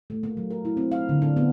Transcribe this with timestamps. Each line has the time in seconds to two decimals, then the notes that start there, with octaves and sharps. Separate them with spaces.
0.10 A3
0.23 A#3
0.37 F#3
0.51 A#4
0.65 E4
0.77 C4
0.92 F5
1.09 D3
1.22 D4
1.36 B3